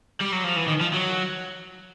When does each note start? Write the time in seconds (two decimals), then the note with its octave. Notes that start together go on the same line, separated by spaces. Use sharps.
0.21 G3
0.32 F#3
0.44 F3
0.56 E3
0.67 D#3
0.81 F3
0.94 F#3